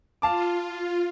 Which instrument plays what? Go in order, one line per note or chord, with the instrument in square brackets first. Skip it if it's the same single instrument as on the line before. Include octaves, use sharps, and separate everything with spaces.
[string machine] F4 [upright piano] F5 A5 D6